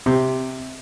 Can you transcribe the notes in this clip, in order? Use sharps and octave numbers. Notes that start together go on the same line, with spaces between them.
C3